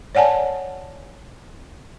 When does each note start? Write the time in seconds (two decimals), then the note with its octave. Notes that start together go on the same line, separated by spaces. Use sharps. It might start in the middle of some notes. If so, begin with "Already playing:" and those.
0.15 C#5 D5 F#5 G#5 A5